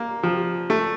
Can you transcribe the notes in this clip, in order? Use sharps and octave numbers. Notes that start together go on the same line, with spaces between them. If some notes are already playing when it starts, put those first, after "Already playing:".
Already playing: A#3
F3
A3